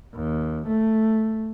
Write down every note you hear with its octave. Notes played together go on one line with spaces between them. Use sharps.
D#2
A3